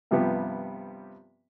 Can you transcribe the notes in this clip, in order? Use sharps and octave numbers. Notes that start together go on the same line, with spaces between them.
G2 C3 F3 G3 B3